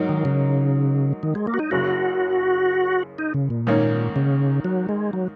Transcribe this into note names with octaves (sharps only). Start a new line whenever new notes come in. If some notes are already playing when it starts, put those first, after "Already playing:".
Already playing: G#2 F#3 D#4 A#4
D#3
C#3
D#3
G#3
A#3
F#4
D#4
F#1 F#2 C#3 F#4
D#4
C#3
A#2
G#2 D#3 A#3 C#4
C#3
F#3
G#3
F#3